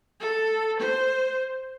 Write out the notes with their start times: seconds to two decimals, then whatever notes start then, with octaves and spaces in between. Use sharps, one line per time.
0.20 A4
0.80 C5